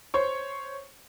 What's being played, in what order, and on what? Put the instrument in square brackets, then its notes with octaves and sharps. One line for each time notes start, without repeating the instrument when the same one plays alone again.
[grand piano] C5 C#5 C#6